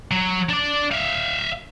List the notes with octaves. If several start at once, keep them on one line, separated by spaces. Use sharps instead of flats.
F#3
D4 D5
E5 F5